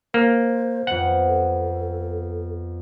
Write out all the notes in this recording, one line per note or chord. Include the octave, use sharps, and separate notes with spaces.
A#3 C5
F2 B3 F#5
A4